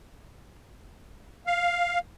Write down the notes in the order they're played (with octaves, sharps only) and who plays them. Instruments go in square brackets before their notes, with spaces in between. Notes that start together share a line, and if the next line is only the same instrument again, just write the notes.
[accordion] F5